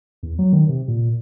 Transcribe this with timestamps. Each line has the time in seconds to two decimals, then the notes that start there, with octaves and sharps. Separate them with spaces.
0.23 E2
0.39 F#3
0.53 D#3
0.69 C3
0.88 A#2